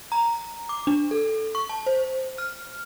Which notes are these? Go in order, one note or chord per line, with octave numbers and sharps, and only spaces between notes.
A#5
D6
D4
A4
C#6
A5
C5
F6